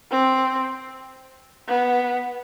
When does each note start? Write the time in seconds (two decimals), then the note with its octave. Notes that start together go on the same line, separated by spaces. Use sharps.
0.11 C4
1.68 B3